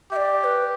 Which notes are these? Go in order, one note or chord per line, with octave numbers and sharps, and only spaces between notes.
G4 D5 E5
D5
B4